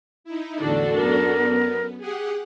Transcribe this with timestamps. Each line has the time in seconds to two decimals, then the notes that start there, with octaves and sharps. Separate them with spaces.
0.24 D#4 E4
0.59 E2 A2 D3 D4 F#4 A4
0.95 F#2 B3 A#4
2.01 G4 G#4 F#5